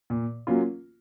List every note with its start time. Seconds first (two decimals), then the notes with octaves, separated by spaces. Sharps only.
0.10 A#2
0.47 F#3 A#3 C#4 F4